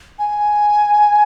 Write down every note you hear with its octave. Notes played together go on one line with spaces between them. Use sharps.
G#5